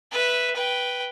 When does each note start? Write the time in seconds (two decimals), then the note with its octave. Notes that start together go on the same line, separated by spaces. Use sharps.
0.11 B4 E5
0.55 B4 G5